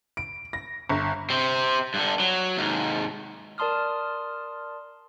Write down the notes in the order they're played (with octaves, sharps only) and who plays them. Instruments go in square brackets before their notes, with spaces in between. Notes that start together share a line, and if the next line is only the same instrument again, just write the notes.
[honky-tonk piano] D7
A#6
G1
[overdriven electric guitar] C3 C4
G2 D3
F#3
D#2 G#2
[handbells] A#4 D5 A5 C6 D#6 F6